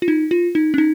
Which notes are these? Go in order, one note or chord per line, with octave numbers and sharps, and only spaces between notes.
F4
D#4
F4
D#4
C#4
D#4